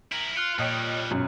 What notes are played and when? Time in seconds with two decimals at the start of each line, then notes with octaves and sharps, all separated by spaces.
0.12 E4 A#4 D7 F#7
0.36 F4 F6 F#6 C#7
0.59 F2 A#2 G3 C#5 D#5 G5
1.11 G#1 F#2 B2 C#4